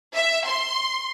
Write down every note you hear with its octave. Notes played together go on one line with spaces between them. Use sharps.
E5
C6